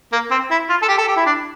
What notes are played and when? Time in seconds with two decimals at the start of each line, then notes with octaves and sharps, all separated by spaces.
0.12 A#3
0.31 C4
0.51 E4
0.69 F4
0.82 A4
0.88 G4
0.98 A4
1.08 G4
1.17 E4
1.26 D4